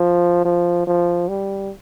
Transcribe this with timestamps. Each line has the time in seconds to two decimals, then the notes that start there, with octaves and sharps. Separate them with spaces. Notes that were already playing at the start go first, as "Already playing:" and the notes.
Already playing: F3
0.45 F3
0.87 F3
1.28 G3